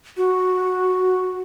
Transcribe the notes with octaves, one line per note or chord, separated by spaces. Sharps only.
F#4